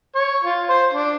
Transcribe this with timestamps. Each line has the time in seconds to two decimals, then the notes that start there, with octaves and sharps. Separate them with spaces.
0.15 C#5
0.44 F4
0.69 C5
0.93 D4